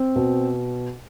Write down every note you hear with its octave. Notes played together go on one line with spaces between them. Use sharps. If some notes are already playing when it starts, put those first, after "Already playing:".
Already playing: C4
B2